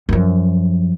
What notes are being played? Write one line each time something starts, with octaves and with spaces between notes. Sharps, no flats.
F#2 F3